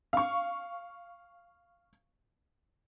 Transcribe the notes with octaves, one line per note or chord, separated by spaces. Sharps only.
F5 C#6